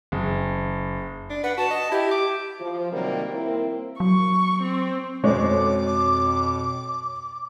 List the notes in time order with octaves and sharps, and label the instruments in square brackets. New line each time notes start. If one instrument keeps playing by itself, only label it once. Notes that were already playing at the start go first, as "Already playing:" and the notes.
[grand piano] F#1
[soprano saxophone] D4
[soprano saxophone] B4 [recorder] F#5
[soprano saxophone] F#4 [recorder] A5
[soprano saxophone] D#5
[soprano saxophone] E4 [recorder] G4
[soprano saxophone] D6
[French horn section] F3
C3 D#3 F#3 G3 A#3
A#3 C4 E4 A#4
[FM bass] F#3 [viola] C#6
[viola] C4
[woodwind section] F2 B2 [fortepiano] G#3 A3 C5 [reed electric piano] C#5 [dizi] D6